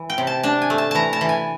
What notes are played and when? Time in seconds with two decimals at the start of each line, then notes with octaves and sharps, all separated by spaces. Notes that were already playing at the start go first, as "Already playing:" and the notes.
Already playing: E3
0.10 G5
0.18 C3
0.27 A5
0.43 D4 A5
0.62 G#5
0.70 A3
0.78 A5
0.91 E3 A5 A#5
1.13 A5
1.21 E3
1.29 G#5